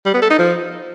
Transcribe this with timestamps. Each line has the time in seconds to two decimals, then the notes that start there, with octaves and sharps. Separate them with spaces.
0.05 G3
0.14 B3
0.22 A4
0.30 D#4
0.39 F3